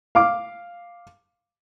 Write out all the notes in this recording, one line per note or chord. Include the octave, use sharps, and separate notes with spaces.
F5 D6